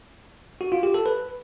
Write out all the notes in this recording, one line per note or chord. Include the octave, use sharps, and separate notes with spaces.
F#4
F4
G4
A4
B4